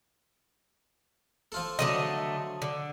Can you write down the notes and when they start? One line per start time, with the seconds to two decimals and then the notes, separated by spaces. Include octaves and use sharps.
1.52 F3 F4 A4
1.79 D3 F3 F#3 A3 D#5
2.62 D3